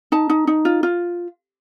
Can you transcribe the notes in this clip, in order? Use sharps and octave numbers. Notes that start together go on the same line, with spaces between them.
D#4 A5
D#4
D#4
F4
F4